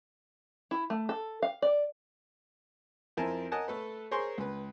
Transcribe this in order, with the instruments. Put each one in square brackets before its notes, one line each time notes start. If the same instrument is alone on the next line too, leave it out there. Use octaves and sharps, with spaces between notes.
[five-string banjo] E4
A3
A4
F5
D5
[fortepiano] F2 C4 E4 A#4 G#5 A5
A#4 D#5 F#5 G#5 A5
A3 A4 B4
G#4 A#4 C5 C#5 C6 C#6
C#2 B4